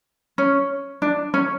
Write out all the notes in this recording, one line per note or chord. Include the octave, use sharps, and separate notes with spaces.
C#4
D4
C#4